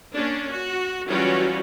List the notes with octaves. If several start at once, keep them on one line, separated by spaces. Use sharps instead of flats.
A#3 C#4 D4
F#4
E3 F#3 G3 C#4 F4 F#4